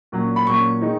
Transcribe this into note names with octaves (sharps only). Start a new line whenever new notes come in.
A#2 F#3 C#4
B5
A#2 F#3 C#4 C#6
D#3 G#3 D#4